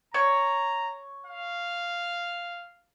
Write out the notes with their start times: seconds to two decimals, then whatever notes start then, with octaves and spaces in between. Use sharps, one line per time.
0.14 C#5 A#5
1.26 F5